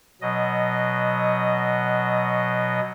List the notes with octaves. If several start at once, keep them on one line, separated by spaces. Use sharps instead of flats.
B2 F#3 D#5